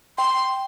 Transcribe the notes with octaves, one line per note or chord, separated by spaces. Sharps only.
G5 C6